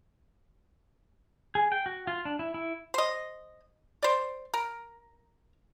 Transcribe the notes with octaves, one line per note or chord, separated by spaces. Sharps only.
G#4
G5
F#4
F4
D4
E4
E4
C5 D#5
C5 D5
A#4